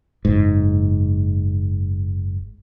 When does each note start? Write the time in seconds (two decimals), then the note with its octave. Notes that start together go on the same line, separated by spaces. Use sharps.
0.25 F#1 G#2